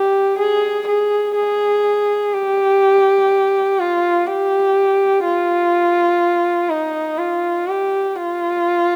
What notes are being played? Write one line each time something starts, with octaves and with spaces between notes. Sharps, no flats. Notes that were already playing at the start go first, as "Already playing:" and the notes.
Already playing: G4
G#4
G#4
G#4
G4
F4
G4
F4
D#4
F4
G4
F4